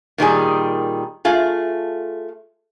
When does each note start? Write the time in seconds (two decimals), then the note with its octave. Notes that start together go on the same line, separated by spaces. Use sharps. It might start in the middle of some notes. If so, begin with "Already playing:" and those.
0.18 A#2 D#3 G3 G#4
1.25 A3 F4 G#4